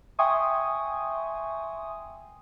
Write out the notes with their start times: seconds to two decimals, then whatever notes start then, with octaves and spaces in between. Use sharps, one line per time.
0.19 E5 G5 G#5 C6 C#6 D#6